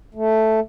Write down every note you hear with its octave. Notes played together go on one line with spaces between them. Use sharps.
A3